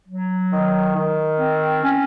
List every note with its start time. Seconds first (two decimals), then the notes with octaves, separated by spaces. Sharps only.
0.08 F#3
0.51 D#3
0.95 D#3
1.39 C4
1.82 C#4